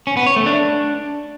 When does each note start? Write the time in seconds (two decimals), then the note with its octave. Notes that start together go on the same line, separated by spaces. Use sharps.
0.07 C#4
0.17 B3
0.26 C#5
0.36 A3
0.46 D4